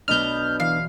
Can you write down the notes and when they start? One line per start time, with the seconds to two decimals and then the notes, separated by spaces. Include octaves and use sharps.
0.08 B1 B3 D4 D#5 B5 F6 G6
0.60 E3 D5 F5